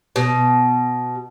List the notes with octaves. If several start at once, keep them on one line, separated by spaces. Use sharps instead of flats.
B2